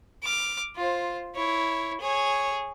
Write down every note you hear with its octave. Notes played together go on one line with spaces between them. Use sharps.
D6 F6
F4 C5
E4 C#5
G#4 C#5